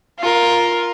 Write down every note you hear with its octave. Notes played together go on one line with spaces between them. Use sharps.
F4 A#4